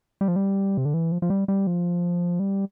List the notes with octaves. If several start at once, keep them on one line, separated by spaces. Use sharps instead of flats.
G3
F3
G3
C3
D3
E3
F3
F3
G3
G3
F3
G3